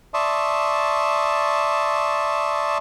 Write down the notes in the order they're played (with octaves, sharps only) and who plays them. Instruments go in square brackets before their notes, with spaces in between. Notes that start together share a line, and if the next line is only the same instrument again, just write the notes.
[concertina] D5 E5 A5 C6 C#6 D#6